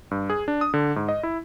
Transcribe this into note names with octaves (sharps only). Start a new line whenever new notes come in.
G2
G#4
D4
D#6
D3
G#2
D#5
E4